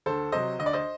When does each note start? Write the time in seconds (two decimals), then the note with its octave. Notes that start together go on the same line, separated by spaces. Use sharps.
0.06 D2 A4 C5
0.32 C3 F#3 C5 D#5
0.59 D2 D#5
0.66 D5
0.73 C5 D#5